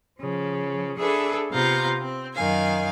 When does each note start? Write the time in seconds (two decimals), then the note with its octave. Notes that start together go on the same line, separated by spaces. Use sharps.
0.19 C#3 F3
0.98 D4 G#4 A4 B4 E5
1.51 C3 B3 F4 F5 A#5 G6
2.00 C4
2.33 F#2 D#3 F5 G#5